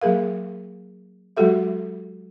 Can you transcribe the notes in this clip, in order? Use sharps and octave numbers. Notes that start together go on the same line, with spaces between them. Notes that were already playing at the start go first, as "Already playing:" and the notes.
F#3 A#3 G#4 A#4 F5
F#3 G#3 F#4 G4 A4 E5